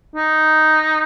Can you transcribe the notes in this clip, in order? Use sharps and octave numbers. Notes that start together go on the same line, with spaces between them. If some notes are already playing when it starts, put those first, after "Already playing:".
D#4